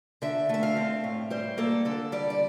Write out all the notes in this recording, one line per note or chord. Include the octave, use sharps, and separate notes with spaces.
D3 E5
A3 E5
F5
C4
A2
G3 C5
A#3 A4
D3 A4
G3 D5
D5